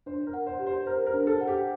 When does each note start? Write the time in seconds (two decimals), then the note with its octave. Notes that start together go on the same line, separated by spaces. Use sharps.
0.06 D4 C5
0.27 A#4
0.33 F#5
0.47 C5
0.59 G4
0.67 C5
0.86 A#4 C5
1.07 A#4
1.14 D4
1.27 A4
1.41 F#5
1.48 G4